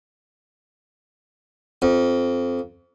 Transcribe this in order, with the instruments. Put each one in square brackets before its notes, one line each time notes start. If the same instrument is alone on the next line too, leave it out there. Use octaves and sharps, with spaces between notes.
[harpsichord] F2